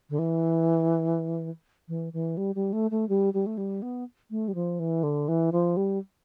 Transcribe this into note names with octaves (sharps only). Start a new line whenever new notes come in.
D3
E3
E3
E3
G3
G3
A3
A3
G3
G3
A3
G3
B3
A3
G3
F3
E3
D3
E3
F3
G3